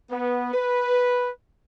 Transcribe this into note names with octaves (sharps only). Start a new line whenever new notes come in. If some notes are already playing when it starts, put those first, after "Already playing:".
B3
B4